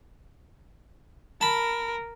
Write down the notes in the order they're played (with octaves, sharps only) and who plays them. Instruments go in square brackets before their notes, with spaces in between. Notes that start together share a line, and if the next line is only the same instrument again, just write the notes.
[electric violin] A#4 [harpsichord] A5 B5